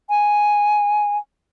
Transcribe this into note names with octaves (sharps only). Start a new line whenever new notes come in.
G#5